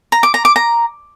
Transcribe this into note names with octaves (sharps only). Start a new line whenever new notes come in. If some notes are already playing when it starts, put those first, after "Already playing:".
A#5
D6
A#5
D6
A#5